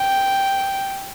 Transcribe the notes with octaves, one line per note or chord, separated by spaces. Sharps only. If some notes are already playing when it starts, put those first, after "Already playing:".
Already playing: G5